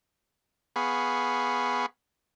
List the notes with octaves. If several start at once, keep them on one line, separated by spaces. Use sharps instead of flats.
B3 G#4 F5 B5 C#6